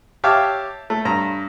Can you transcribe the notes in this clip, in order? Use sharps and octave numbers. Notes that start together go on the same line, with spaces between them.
G4 C#5 E5 F5 G5 A5
A3
G2 A#5